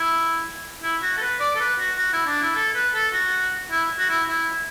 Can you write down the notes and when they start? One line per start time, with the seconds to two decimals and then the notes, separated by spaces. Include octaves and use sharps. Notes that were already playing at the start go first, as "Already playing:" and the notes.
Already playing: E4
0.83 E4
1.02 F#4
1.17 A4
1.21 B4
1.40 D5
1.55 A4
1.60 B4
1.79 F#4
1.98 F#4
2.13 E4
2.27 D4
2.41 E4
2.56 A4
2.75 B4
2.94 A4
3.13 F#4
3.71 E4
3.99 F#4
4.10 E4
4.28 E4